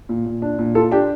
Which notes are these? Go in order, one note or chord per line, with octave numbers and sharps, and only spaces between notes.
A#2
A#2
D4
A#2
F4 A4
D4 G4